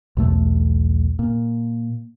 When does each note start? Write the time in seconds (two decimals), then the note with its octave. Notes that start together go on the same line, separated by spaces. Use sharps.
0.17 B1 E2 A3
1.19 A#2